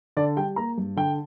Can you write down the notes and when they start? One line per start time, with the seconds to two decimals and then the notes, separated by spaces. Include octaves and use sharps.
0.17 D3 D5
0.37 G3 G5
0.56 A#3 A#5
0.78 G2
0.97 D3 G5